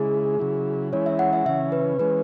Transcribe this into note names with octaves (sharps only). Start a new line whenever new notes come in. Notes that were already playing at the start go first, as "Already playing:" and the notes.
Already playing: C#3 G#3 E4 G#4
C#3 F#3 E4
E3 G#3 C#4 E4 C#5
E5
F#5
E5
C#3 E3 C#4 E5
B4
E3 G#3 C#4 B4